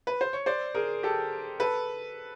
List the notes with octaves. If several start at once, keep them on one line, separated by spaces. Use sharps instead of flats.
B4
C5
C#5
C5 D5
G#4 A#4
G4 A4
A4 B4